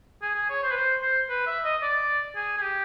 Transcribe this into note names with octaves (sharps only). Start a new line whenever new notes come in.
G#4
G#4
C#5
C5
B4
C5
C5
B4
E5
D#5
D5
G#4
G#4
G4